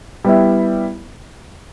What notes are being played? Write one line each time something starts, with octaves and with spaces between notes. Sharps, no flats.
G3 B3 E4